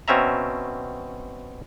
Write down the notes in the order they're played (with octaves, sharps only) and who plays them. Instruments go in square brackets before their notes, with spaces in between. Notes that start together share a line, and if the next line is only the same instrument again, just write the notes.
[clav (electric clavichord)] B2 C4 C#4 E5 A#5